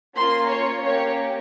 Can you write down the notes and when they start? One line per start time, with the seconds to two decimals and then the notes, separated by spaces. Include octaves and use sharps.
0.15 A#3 C#4 F4 C6
0.48 C#5
0.82 A#3 C#4 G4 C#5